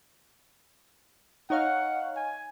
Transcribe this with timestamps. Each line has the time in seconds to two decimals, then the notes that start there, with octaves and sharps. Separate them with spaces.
1.50 D#4 C#5 F5 F#5
2.16 G#5